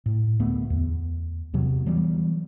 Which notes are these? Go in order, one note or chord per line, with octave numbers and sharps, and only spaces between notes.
A2
D2 A3 B3
E2
E2 C3 F#3
E3 F#3 G3 B3